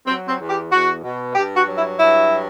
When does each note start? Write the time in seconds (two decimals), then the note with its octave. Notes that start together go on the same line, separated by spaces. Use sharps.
0.07 F#3 C4
0.28 C4
0.38 E2
0.50 G4
0.71 E2 F#4
1.03 B2
1.35 G2 G4
1.57 F#4
1.67 F#3
1.78 E4
1.99 G2 E4
2.32 F#3